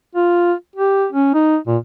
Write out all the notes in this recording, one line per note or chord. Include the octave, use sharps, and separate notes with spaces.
F4
G4
C#4
D#4
A#2